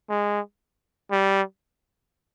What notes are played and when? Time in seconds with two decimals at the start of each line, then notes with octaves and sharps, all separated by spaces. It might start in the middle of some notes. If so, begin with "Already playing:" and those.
0.10 G#3
1.11 G3